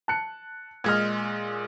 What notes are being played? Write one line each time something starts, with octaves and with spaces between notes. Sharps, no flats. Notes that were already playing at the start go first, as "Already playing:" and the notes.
A5 F#6 C#7
A#2 G#3 D#5 F6 G#6